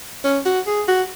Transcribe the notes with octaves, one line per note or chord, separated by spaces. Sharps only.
C#4
F#4
G#4
F#4